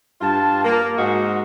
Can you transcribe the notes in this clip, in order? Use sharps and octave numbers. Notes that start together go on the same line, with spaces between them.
G2 F4 A5
A#3
G#2 F#4 D#5